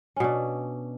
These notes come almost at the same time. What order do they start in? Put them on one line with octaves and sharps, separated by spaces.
C#4 B2 D4